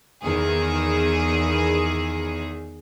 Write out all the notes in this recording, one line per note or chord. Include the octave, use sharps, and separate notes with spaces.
E2 D#3 G#4